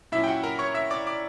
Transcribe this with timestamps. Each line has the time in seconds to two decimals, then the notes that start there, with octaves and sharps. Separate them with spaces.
0.12 A#2 F#3 C#4 E4 E5
0.24 G5
0.27 F#4 F#5
0.43 A#4 A#5
0.59 C#5 C#6
0.75 E5 E6
0.91 D5 D6
1.07 D5 D6